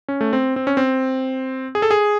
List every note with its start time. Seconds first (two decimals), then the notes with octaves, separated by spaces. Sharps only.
0.08 C#4
0.21 A3
0.33 C4
0.56 C4
0.67 C#4
0.77 C4
1.75 G#4
1.82 A4
1.91 G#4